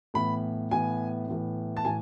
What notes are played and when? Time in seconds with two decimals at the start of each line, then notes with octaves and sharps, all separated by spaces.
0.14 A2 E3 B3 B5
0.71 A2 E3 B3 G#5
1.28 A2 E3 B3
1.77 A5
1.85 A2 E3 G#5